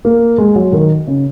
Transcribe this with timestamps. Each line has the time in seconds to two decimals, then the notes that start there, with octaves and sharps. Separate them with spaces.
0.05 A#3
0.38 G#3
0.56 F#3
0.73 D#3
1.07 C#3